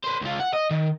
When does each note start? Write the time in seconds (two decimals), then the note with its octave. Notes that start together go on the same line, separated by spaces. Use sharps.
0.04 B4 C5
0.22 C#2 F4
0.40 F#5
0.54 D#5
0.71 D#3